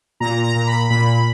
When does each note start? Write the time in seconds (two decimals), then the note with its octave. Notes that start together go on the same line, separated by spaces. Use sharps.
0.20 A#2 A#5
0.44 A#5
0.56 A#2
0.67 B5
0.90 A#2 B5